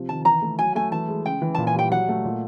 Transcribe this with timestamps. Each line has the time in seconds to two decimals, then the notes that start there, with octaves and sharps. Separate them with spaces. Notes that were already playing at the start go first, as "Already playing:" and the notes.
Already playing: C3 F3
0.09 D#3 A5
0.25 E3 A#5
0.42 A3
0.59 F#3 G#5
0.75 A3 G#5
0.92 E3 A5
1.08 G#3
1.25 C#3 G5
1.42 E3
1.55 A#2 A5
1.67 G#5
1.75 G3 G5
1.91 F#3 F#5
2.08 A3
2.25 A#2